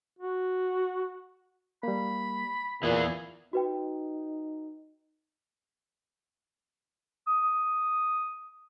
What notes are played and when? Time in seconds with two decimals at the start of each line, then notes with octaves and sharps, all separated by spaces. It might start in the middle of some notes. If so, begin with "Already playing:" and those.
0.19 F#4
1.83 G3 A#3 B5
2.83 E2 A#2 E3 G#4 E5 F#6
3.53 D#4 F#4 B4 G5
7.27 D#6